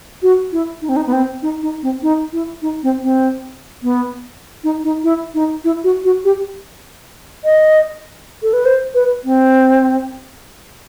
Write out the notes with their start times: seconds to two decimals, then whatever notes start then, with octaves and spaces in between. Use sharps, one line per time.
0.23 F#4
0.52 E4
0.82 D#4
0.89 C4
0.96 D#4
1.06 B3
1.13 C4
1.42 D#4
1.63 D#4
1.83 C4
2.03 D#4
2.33 E4
2.62 D#4
2.83 C4
3.03 C4
3.83 B3
4.64 D#4
4.84 D#4
5.04 E4
5.34 D#4
5.64 E4
5.84 F#4
6.04 F#4
6.25 G4
7.45 D#5
8.43 A4
8.53 B4
8.65 C5
8.95 B4
9.24 C4